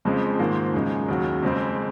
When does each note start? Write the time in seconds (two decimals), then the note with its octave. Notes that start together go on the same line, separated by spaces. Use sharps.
0.05 F2 C#3 F3 G#3 C4
0.39 G#2 D#3 A#3 F4 C5
0.74 F#2 C#3 G#3 D#4
1.08 D#2 C#3 F#3
1.42 F2 C#3 G#3 C4